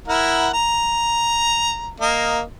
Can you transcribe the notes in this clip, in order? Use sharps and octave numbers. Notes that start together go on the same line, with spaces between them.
E4 A#4 F#5
A#5
A#3 D#5